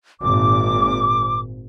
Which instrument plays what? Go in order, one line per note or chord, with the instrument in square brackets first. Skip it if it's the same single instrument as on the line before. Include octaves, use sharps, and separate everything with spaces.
[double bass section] G#1 A#2 [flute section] D6